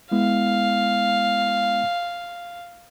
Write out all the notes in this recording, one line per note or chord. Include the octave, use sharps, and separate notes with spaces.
G#3 B3 E4 F5